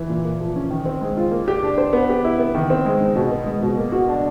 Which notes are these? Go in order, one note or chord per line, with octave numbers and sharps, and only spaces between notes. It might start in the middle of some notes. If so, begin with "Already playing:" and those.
Already playing: E3
A#2
A#3
F3
C#4
D#3
C4
G#3
F4
A#3
G4
D4
C5
B3
G4
E4
B3
D#3
C4
G#3
D#4
B2
B3
G#3
B2
A#3
F#4
D4